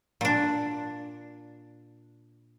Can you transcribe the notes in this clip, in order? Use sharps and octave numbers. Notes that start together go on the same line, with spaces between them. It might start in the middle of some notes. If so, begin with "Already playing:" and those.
A#2 D4